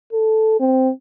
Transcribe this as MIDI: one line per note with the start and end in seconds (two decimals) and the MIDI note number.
0.13 0.58 69
0.60 0.91 60